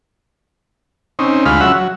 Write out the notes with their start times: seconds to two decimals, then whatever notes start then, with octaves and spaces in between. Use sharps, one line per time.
1.19 C4 C#4 D#4
1.46 D2 G#3 F4 F5 B5
1.61 F#3 C#4 F4 E5 F#5
1.76 F#3